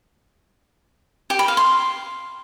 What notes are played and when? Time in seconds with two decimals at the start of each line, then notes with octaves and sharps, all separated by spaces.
1.30 G4
1.39 B5
1.48 F5
1.57 C6